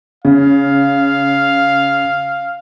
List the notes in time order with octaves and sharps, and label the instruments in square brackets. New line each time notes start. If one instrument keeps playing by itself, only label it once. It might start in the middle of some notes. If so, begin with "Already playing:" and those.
[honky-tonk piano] C#3 [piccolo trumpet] F5